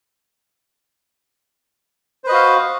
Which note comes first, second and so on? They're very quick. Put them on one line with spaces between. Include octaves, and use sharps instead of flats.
C5 B4 D#5 F#4 F5